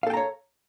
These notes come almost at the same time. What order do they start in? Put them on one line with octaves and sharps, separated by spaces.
F5 A4 G5 A#5 C#5